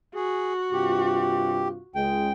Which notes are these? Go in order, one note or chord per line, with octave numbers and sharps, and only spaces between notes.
F#4 G#4
G2 C3 F4 G4
C#2 G#3 G5